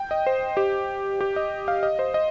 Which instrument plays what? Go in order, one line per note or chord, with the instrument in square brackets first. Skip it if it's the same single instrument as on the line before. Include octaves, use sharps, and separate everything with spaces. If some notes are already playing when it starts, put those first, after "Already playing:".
Already playing: [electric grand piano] G5
D#5
C5
G4
G4
D#5
F5
D#5
C5
D#5